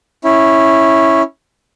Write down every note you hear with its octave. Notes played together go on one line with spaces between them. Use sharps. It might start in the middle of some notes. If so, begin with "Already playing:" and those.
C#4 E4